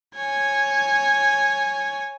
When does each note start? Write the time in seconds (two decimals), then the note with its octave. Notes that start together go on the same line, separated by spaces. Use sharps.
0.16 C#5 G#5